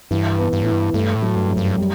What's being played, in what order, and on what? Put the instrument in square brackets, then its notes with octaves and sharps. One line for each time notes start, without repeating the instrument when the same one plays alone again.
[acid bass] G2 [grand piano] E3
[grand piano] B3
[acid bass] G2
[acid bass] A2 [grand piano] E4
[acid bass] G2
[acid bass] G2 [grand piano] A3
[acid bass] A2
[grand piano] F#3
[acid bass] G2
[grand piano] F#2
[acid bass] G2
[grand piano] G3